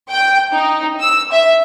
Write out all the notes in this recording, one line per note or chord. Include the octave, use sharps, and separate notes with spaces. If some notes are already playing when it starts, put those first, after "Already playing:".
G5
D#4
E6
E5